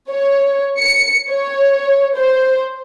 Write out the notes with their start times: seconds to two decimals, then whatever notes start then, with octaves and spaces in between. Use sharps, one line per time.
0.11 C#5
0.79 C#7
1.31 C#5
2.15 C5